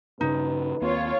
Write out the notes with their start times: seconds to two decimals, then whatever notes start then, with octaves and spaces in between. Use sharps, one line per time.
0.21 G2 C#3 C#4 D#4 B4
0.81 D#2 A#3 C4 F4 C#5